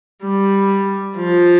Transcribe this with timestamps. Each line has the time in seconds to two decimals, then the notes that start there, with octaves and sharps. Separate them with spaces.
0.23 G3
1.17 F3